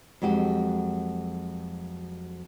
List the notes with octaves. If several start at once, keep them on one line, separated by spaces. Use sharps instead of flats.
F2 F#3 G#3 F#4 G4